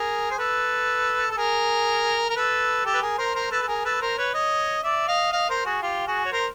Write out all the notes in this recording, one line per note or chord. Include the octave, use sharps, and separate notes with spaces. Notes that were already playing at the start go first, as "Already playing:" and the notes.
Already playing: G#4 A#4
C5
A4 B4
A4
G#4 A#4
A#4
A4 B4
G4 A4
B4
G#4 A#4
A#4 C5
A#4 C5
A4 B4
A4
G#4 A#4
A4 B4
A#4 C5
B4 C#5
C#5 D#5
D5 E5
D#5 F5
D#5 F5
A#4 C5
F#4 G#4
F4 G4
F#4 G#4
C#5
A#4 C5